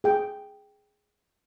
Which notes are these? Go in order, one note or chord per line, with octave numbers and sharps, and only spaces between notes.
G#4 G5